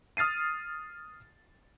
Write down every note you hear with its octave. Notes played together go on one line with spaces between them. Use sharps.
D#6 F6 A6 C7 D#7